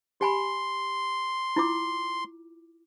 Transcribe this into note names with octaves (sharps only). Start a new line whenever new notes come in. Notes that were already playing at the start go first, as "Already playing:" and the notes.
G4 G#5 B5 C6
E4 F4 D6